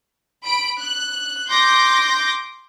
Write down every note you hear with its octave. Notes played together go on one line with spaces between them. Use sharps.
B5 D7
F#6
C6 D6 G6 A#6